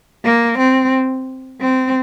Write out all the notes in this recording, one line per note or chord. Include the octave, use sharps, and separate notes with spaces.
A#3
C4
C4